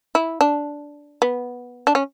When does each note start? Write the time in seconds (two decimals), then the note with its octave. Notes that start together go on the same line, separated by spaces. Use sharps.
0.15 E4
0.41 D4
1.22 B3
1.87 D4
1.95 C#4